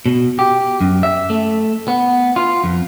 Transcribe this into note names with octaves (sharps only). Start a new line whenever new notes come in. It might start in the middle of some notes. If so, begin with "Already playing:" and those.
B2
G4
F#2
E5
A3
B3
F4
F2